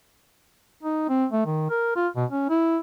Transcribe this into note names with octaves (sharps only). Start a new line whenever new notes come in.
D#4
C4
A3
D#3
A#4
F4
B2
C#4
E4